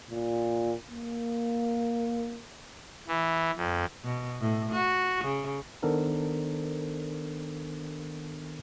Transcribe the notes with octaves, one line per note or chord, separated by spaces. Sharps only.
A#2
A#3
E3
F2
B2
A2
F#4
C#3
D#3 B3 D4 A4 A#4 C5